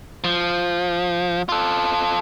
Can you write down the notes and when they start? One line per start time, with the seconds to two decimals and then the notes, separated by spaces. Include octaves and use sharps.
0.24 F3
1.49 F4 A4